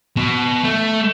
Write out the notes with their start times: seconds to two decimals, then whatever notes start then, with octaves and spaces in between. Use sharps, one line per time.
0.17 B2
0.64 A3